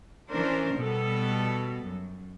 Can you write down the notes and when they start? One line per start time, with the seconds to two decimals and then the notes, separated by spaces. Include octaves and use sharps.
0.29 E3 C#4 D4 A#4 C5
0.76 B2 G3 B3 A4
1.86 F#2